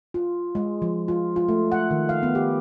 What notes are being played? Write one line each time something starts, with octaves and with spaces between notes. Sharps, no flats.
F4
G#3
F3
F4
F4
A3
F#5
D#3
F5
B3
G4